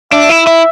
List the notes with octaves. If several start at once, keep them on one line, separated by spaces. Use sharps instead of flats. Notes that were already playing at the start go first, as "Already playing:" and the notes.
D4 E5
E4
E4